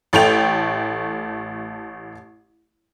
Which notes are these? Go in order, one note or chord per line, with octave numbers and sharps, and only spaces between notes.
A1 A3 G5 F7